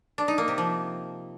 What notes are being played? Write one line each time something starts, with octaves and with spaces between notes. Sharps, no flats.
D4
D#4
A#3
C3
F3